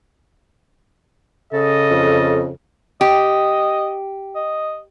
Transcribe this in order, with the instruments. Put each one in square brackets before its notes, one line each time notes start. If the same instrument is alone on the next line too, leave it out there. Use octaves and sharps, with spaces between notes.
[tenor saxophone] C#3 [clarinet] A4 [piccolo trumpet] D#5
[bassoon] F2
[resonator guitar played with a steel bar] G4 [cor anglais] D#5
[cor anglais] D#5